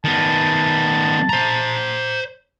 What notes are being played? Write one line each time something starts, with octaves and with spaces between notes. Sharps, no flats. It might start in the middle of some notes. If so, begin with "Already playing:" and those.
D#3 B3 A5
C5 A#5